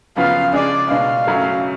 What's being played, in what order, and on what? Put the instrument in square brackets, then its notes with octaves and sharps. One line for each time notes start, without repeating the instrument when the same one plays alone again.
[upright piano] F#2 C#3 F3 B3 F4 [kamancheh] F5
[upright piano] C#3 G#3 D4 G#4 [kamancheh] D5
[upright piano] B2 G#3 D4 [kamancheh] F5
[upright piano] F#2 C#3 F#3 A3